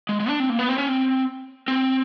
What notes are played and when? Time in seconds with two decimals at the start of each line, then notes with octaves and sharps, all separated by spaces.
0.09 G#3
0.20 G#3
0.29 D4
0.40 C4
0.50 A#3
0.59 B3
0.69 C4
0.78 C#4
0.88 C4
1.68 C4